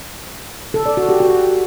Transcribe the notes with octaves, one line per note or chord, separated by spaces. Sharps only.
A4
D5
F#4
G4
F#4